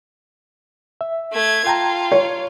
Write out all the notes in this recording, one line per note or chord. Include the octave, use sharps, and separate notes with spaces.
E5
A3 G#6
F4 G5 A5 A#5
C#5